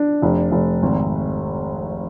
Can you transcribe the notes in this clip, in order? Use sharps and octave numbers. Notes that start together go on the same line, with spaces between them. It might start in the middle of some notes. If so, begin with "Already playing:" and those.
Already playing: D4
F1
F1
G#1